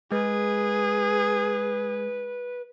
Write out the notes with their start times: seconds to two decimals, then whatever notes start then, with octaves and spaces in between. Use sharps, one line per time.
0.12 G#3 G#4 B4